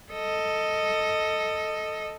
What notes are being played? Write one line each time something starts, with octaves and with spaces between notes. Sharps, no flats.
A4 D#5